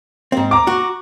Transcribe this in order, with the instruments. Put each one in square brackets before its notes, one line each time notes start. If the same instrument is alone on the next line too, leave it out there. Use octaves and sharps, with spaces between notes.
[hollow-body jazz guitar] G#2 C4
[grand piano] A#5 D6
[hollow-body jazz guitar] F#4